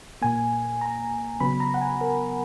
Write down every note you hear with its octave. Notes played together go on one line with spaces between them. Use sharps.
A#2 A#3 G#5
A#5
C#3 F#3 B3 B5
A#5
F#5
G#5
A#4